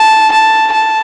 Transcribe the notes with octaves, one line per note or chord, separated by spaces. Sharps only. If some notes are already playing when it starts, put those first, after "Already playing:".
Already playing: A5
A5
A5